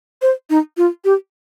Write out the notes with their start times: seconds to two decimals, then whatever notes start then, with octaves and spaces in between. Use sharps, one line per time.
0.22 C5
0.50 D#4
0.77 F4
1.05 G4